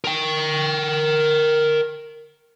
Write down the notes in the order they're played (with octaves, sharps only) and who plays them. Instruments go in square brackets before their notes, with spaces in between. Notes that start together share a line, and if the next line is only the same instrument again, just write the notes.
[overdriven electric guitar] A#4 G5